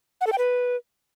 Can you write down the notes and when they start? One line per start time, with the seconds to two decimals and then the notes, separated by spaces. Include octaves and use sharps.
0.21 F#5
0.27 A4
0.32 G5
0.38 B4